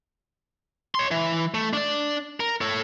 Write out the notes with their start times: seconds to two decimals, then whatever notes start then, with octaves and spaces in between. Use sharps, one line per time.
0.95 C#5 C6
1.11 E3
1.54 A3
1.73 D4 D5
2.40 A#4
2.61 A4 C#5